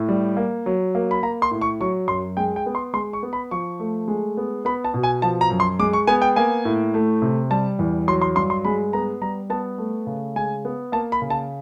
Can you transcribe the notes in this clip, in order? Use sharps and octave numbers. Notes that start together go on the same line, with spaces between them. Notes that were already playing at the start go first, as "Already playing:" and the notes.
Already playing: A2
G3
A#3
F#3
A#3
B5
A#3 A#5
C6
A2
C#6
F#3 C#6
F#2 C6
G#3 G5
G5
B3
C6
G#3 C6
C#6
B3
B5
F3 C#6
A3
G#3
B3
B3 B5
A5
B2
G#5
F3 A5
A#5
F#2
C6
G#3 D6
C#6
B3 G#5
G5
A#3 G#5
A2
A3
C3
G3 A5
E2
F#3 C6
C6
G2 C6
C6
G#3 B5
B3 A#5
G3 A#5
B3 A5
A3
C#3
G#3 G#5
B3
A#3 A5
B5
C#3
A5